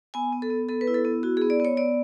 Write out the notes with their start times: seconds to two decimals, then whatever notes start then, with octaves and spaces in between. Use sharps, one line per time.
0.14 B3 G#5
0.33 B3
0.42 A4
0.50 B3
0.69 B3 A4
0.81 B4
0.87 E4
0.94 A4
1.05 B3
1.23 E4 F#4
1.37 G#4
1.41 B3
1.50 D5
1.60 B3 C#5
1.77 B3 D5